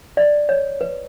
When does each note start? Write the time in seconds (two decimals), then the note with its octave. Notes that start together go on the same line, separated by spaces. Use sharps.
0.17 D5
0.49 C#5
0.81 B4